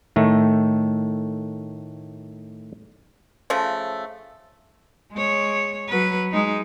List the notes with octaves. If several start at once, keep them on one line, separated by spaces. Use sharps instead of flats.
A2 D#3 A3
C#3 F3 A3
G#3 C#5
F#3 B4
G#3 D#4